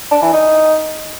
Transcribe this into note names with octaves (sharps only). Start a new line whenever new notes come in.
D4
E3
D#4